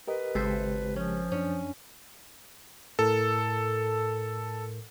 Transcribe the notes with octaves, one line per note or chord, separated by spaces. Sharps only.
G4 A#4 B4 D#5
G#1 C#3 G#3 G4 A4 C5 E5
F3 C#4
F#2 C#4 D4
A2 A4 A#4